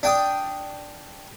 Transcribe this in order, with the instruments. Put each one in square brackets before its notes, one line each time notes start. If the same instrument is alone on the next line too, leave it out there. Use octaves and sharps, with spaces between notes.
[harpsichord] D4 G5 D#6